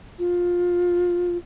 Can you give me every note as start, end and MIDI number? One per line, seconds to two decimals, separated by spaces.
0.19 1.37 65